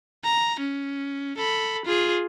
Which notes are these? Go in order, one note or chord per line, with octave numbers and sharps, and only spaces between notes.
A#5
C#4
A4 B5
F4 G#4